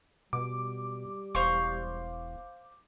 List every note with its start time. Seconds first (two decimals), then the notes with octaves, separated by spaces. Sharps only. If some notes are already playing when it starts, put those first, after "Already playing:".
0.33 B2 G3 D6
1.35 E1 C5 F5 C#6